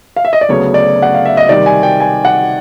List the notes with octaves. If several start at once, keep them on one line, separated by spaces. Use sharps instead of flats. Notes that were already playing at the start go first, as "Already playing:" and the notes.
F5
E5
D#5
D5
D2 C#3 F#3 B3 C#5
D5
F#5
F5
E5
D#5
C3 D#3 G3 D5
G#5
G5
G#5
F#5